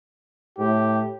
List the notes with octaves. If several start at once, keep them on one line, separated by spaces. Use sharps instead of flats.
A2 G4